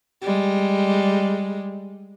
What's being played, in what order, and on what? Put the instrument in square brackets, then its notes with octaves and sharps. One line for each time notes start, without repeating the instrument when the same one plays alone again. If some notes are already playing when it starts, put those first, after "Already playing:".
[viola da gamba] G3 G#3